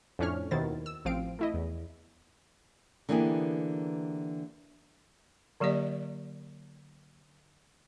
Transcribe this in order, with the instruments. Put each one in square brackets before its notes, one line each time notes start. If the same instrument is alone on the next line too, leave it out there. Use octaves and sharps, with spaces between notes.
[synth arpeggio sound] F2 A2 C#4 D4 C#5 F6
D#2 B2 D#3 E4 C5 A6
E6
A1 F3 C4 F5 D7
A3 E4 D#5
E2
[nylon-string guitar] D3 E3 A#3 B3 G4 G#4
[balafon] D3 F#3 A#3 G4 D5 D#5